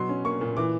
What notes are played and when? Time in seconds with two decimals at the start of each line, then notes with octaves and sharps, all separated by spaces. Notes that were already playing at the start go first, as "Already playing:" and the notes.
Already playing: B2 F#3 C6
0.09 C#4
0.25 A#3 C#6
0.41 A#2
0.57 E3 D6